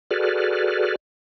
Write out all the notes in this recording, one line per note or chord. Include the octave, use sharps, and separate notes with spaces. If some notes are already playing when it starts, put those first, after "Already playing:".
F#4 G#4 A4 B4 D5 F6